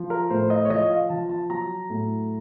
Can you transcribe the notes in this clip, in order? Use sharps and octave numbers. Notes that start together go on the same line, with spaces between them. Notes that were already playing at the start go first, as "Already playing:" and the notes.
Already playing: F3
A#4
A2 C5
D#5
C#5
F3 D#5
F5
F3 A5
A5
F#3 A#5
A2